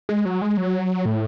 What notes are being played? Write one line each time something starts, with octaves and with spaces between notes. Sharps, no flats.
G#3
F#3
G#3
F#3
A2